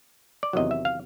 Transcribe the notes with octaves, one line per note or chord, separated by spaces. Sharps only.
D5
E2 C3 D#3 F#3 D#5
E5
F5